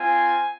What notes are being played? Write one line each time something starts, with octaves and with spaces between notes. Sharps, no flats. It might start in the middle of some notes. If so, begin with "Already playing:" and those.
Already playing: C4 F4 G#5